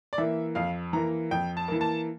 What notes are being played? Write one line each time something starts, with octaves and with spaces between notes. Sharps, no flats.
D5
E3 A#3 E5
F2 F5
E3 A#3 A#5
F2 G5
A5
E3 A#3
A5